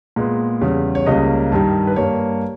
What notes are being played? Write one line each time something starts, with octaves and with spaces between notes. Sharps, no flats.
A#2 G#3 B3
E2 C#3 G3
C#5
C#2 C#3 G3 A#3 D#5
G2 D#3 G3
B4
G2 G3 A#3 C#5